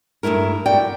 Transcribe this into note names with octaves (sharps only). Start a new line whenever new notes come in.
G2 A#2 A3 E4 A#4
F#4 D5 G5